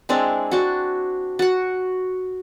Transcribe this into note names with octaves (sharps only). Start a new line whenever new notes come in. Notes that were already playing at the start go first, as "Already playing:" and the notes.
G#3 C4 D4 E4
D4 F#4
F#4 F#5